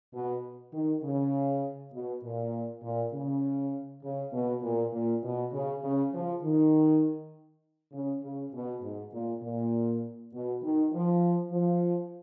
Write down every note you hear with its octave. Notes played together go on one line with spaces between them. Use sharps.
B2
D#3
C#3
B2
A#2
A#2
C#3
C#3
B2
A#2
A#2
B2
C#3
C#3
F3
D#3
C#3
C#3
B2
G#2
A#2
A#2
B2
D#3
F3
F3